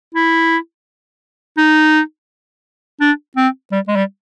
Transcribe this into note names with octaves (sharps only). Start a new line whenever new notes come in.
E4
D#4
D4
C4
G3
G#3
G3